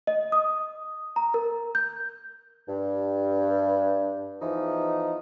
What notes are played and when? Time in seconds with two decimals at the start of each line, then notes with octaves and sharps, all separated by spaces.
0.07 D#5
0.32 D#6
1.16 A#5
1.34 A#4
1.75 G6
2.68 G2
4.41 E2 E3 F3 D#4